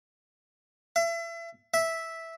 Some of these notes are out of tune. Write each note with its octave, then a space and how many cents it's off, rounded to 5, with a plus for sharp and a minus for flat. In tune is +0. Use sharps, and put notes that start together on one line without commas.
E5 +35
E5 -5